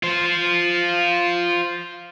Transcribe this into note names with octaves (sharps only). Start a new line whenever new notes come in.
F4 C5